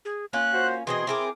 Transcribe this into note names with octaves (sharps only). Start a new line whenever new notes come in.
G#4
A#3 C#4 F4 F#6
F#4 C5
B2 E3 C4 G#4 D#5 C6
C4 E4 G#4 A#4 D6